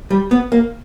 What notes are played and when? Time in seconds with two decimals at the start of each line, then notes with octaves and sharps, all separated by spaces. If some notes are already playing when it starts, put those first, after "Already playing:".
0.11 G3
0.31 B3
0.52 A#3